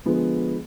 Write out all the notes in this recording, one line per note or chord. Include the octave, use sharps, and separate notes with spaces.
D3 F3 G#3 B3